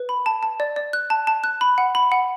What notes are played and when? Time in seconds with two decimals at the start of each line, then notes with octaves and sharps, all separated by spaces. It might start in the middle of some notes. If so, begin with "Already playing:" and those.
Already playing: B4
0.09 B5
0.26 A5
0.43 A5
0.60 D5
0.76 D5
0.93 F#6
1.10 A5
1.27 A5
1.44 F#6
1.61 B5
1.78 F#5
1.95 B5
2.12 F#5